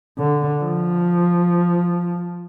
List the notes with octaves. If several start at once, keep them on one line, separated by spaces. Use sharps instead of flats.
D3
F3